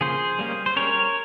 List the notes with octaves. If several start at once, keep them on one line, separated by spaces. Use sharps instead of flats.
C#3 F3 A#3 C#4 G#4 C5
G3 A#3 C#4
C5
G3 C#4 A#4 C#5